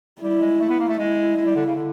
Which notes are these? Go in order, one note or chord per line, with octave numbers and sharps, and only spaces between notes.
G3 E4
G#3
A3
B3
A#3
A3
G#3 E4
G#3
G3
D3
C#3
D3